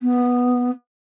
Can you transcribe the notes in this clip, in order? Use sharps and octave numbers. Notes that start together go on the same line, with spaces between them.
B3